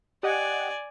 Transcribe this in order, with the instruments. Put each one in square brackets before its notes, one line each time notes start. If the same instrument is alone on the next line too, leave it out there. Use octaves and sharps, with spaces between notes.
[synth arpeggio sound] G4 D#5 F#5 [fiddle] D5 G#5